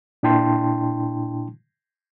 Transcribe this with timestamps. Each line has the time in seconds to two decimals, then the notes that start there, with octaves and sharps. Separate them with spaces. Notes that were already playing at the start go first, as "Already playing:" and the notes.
0.23 A#2 D4 E4 G5 A5 C6